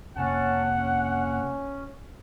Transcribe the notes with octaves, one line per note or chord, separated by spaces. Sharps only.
F2 C3 A#3 C#4 F#5 A5
C#4